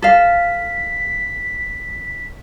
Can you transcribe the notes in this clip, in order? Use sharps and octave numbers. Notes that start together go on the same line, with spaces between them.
A4 F5 B6